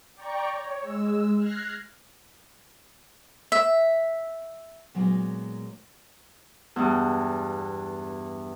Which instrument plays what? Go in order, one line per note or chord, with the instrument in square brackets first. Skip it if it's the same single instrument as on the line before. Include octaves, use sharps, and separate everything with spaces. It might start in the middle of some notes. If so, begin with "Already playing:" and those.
[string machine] D5 G5 A#5 C#6
C#5
G#3 E6
F6 F#6 G#6 A#6 C7
[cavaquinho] E5
[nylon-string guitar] A#2 F#3 G#3 B3 D#4
[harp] E2 G2